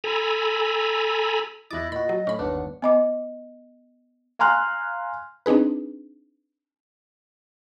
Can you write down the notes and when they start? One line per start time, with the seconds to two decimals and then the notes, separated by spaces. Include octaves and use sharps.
0.04 A4 G#5 A#5 B5
1.71 E2 E4 D#5 D6 F#6 A6 A#6
1.92 A#2 F#4 D#5 B5
2.09 F#3
2.27 A2 C#4 B5
2.39 G1 D#2 D4 B4 C#5 F#5
2.82 B3 D#5 D6
4.39 F5 G#5 A#5 C6 F6 F#6
5.46 C4 D4 D#4 G#4 B4